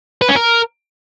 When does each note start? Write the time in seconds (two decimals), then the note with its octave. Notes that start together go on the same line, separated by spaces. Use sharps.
0.21 B4
0.29 C#4
0.36 A#4